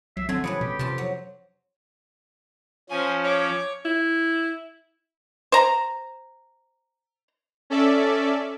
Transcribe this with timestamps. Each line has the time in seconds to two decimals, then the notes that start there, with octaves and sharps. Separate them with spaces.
0.17 C2 F#3 E5 C7
0.29 D3 F#3 A3 C4 G#5
0.44 C#3 F3 G3 B4 B5 D#6 C#7
0.61 B2 G4
0.79 F2 C3 A5 C6
0.98 F#3
2.90 F3 C#4 C5 G#5
3.25 C#5 D6
3.85 E4
5.52 C5 A#5
7.70 C#4 A4 D5 E5